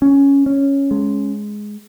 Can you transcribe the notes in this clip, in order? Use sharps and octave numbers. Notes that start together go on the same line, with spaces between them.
C#4
C#4
G#3